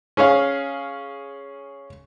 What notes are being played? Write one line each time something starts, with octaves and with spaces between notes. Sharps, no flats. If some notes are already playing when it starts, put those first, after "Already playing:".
C#4 G#4 C#5 F5